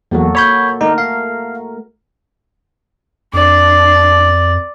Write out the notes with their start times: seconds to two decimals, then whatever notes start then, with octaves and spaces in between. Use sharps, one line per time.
0.11 E2 F#3 A#3 F#4 A4
0.35 C#5 B5 G6
0.81 D3 A3 D#4 A#4
0.98 F5
3.34 F2 D4 D5